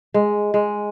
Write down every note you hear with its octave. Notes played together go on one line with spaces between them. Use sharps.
G#3
G#3